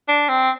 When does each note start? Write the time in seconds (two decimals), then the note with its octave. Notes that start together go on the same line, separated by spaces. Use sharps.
0.08 D4
0.29 C4